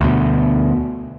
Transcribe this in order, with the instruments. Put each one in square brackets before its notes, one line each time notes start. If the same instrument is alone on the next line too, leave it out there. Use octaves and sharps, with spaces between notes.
[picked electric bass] D2 B2